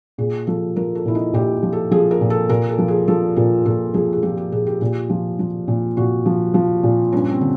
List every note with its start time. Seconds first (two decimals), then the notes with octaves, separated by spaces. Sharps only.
0.18 A#2 G#4
0.47 F3 A4
0.76 F3 A#4
0.95 A4
1.05 A#2 E4
1.15 D#4
1.33 A#2 G4
1.63 F3
1.72 A4
1.91 F3 G#4
2.11 A#4
2.21 A#2
2.30 A4
2.49 A#2 A#4
2.69 A4
2.78 F3
2.88 G#4
3.08 F3 A4
3.36 A#2 A#4
3.65 A#2 A4
3.94 F3 G#4
4.13 G#4
4.23 F3 G4
4.37 G4
4.52 A#2 G#4
4.67 G4
4.81 A#2 G4
5.10 F3
5.39 F3
5.68 A#2
5.97 A#2 F#4
6.26 F3
6.54 F3
6.83 A#2
7.13 G2 C#4
7.31 C4
7.41 D3